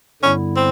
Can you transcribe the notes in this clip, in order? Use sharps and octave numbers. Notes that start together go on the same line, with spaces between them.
G2 D3 G3 B3 C#4 E4
C4